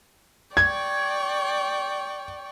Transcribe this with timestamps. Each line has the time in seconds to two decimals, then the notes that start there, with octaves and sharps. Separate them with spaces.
0.57 D5 G5 C#6 G#6